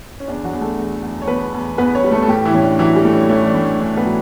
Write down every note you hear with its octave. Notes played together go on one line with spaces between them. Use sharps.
C#4
E2 D4
F#3 F#4
E2
A3 A4
E2
E2
C#5
E2 B3 B4
E2
E2 B3 B4
C#4 C#5
G3
A3 A4
A4
A2 G3 G4
E3 E4
A2 C#4
D4
E3 F#3 E4
G3 G4
A3
C#4
A3 C#4
D4
A2
A2 D4
B3 B4
F#3